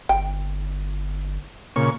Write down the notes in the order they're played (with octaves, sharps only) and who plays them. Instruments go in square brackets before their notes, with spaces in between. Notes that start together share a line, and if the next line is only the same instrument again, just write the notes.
[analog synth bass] G1 [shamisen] G5
[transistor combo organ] A#2 C#3 C#6